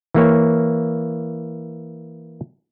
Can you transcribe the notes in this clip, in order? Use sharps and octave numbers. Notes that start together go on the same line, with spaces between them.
E3 A#3 C#5